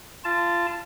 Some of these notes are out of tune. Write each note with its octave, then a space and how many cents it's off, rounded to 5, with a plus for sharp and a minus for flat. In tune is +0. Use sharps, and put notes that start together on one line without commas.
F4 -25 A5 +0